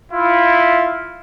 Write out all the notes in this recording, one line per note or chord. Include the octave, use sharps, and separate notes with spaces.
E4 F4